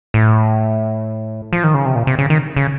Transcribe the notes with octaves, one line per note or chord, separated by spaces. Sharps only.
A2
F3
D#3
C#3
C3
A#2
C3
C#3
D#3
C#3